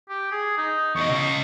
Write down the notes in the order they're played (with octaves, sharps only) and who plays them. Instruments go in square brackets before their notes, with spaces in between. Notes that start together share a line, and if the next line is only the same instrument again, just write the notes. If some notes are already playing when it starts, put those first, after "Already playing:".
[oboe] G4
G#4
D#4
[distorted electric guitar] E2 D#5 [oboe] C#6
[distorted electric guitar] C#3 D#5